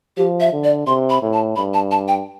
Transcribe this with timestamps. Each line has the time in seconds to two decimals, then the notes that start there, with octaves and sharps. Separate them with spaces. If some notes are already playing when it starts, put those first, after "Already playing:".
0.17 F3 G4
0.40 E5
0.52 D3
0.64 D5
0.87 C3 C6
1.10 B5
1.22 A2
1.33 A5
1.56 G2 B5
1.74 A5
1.91 A5
2.08 G5